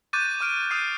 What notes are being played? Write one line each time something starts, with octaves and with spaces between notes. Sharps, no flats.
C#6 D6 F#6 G6 A6 D#7
D6 F6 D7
D#6 F6 G6 C7 D#7